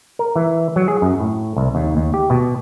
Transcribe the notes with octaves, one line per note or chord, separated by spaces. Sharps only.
A#4
E3
F#3
G#4
F#2
A2
C2
D#2
D#2
G4
B2